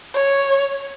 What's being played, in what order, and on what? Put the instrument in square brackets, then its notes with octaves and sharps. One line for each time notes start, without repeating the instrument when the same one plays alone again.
[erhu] C#5